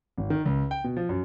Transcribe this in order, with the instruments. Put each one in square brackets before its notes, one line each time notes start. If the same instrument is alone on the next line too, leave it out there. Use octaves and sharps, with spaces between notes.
[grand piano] G#1
D#3
C#2
G5
B2
F3
F#2